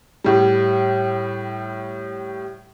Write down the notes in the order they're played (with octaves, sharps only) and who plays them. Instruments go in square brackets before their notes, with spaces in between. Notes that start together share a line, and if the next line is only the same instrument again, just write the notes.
[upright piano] A2 G3